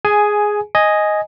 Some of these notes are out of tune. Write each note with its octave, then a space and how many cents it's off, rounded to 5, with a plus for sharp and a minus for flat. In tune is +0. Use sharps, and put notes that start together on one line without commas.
G#4 +0 G#5 +10
D#5 +0 G#5 +0